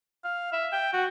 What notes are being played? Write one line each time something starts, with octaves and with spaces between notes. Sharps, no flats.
F5
E5
G5
F#4